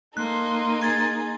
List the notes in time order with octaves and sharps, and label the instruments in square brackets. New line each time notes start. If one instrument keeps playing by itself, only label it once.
[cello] A#3 [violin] D#4 [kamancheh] A4 C6 [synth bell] F#6
[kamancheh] G#4 [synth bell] C6 G#6 A6